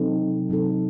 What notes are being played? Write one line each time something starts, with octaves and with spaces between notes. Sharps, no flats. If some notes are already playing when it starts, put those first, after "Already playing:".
Already playing: C3 F#3 C4 D#4 A4
C3 F#3 C4 D#4 A4